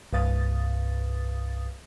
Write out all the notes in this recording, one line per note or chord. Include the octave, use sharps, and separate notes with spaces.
C2 G2 B4 F5 D#6 A6